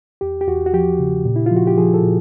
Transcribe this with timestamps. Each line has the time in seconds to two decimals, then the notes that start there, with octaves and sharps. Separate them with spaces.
0.21 E2 G4
0.41 G4
0.47 E2 F#4
0.66 F#4
0.73 F3 G4
0.99 C#3
1.25 A#2
1.36 E4
1.46 F3 F4
1.56 F#4
1.67 G4
1.78 F3 G#4
1.94 A4
2.03 A#2